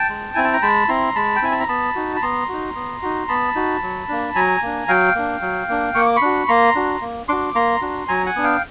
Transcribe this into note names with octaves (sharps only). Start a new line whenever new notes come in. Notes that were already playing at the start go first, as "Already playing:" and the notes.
Already playing: G5 A5
G#3
C4 E4 G#5
A5
A#5
G#3 A5 B5
C4 E4 A#5 C6
G#3 A5 B5
G5
C4 E4 G#5
A5
A#5
B3 A5 B5
D#4 F#4
B5
B3 A#5 C6
D#4 F#4
B3
D#4 F#4
B3 A5 B5
D#4 F#4
F#3
A#3 D4
F#3 G#5 A#5
A#3 D4
F#3 F5 G5
A#3 D4
F#3
A#3 D4
A#3 C#6
D6
B5 C#6
D4 F#4
A#3 A#5 C6
D4 F#4
A#3
D4 F#4 C6 D6
A#3 A#5 C6
D4 F#4
F#3 G#5 A#5
F#5 G#5
B3 D4
F5 G5